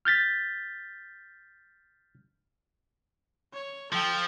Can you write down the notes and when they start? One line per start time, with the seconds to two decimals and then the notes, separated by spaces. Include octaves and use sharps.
0.05 F6 G6 A6 B6
3.54 C#5
3.93 F3 A4 G5